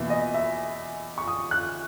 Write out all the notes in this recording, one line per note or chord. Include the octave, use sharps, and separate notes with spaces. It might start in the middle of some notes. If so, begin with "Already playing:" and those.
Already playing: E2 B2 A#3 E5
D#5
E5
C#6
D#6
F#6